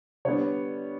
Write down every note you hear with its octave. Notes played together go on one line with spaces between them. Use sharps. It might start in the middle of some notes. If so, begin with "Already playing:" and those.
D3 G3 B3 D4 C#5